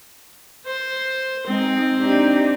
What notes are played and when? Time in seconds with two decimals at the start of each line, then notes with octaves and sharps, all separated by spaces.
0.66 C5
1.47 G#3 C4 D#4
1.97 D4 D#4 G4